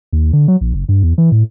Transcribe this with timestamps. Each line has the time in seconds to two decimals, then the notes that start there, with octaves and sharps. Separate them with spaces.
0.13 D#2
0.33 D3
0.48 F#3
0.61 A#1
0.74 F#1
0.89 G2
1.03 E2
1.18 E3
1.32 A2